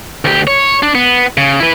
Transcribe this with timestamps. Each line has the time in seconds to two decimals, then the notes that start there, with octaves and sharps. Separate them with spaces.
0.25 D2 G4
0.47 C#5
0.83 D4
0.95 B3
1.37 C#3
1.60 E4 B4